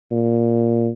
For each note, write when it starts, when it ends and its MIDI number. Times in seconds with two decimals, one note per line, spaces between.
0.11 0.89 46